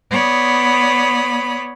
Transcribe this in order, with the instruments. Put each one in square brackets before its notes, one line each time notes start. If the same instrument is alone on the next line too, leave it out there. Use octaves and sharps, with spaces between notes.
[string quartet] B3 C#5 D5 B5 D#6